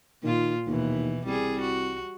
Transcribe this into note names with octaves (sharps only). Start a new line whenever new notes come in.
A#2 D#3 F4
D#2 B2 E3
C2 G3 G#4
F#4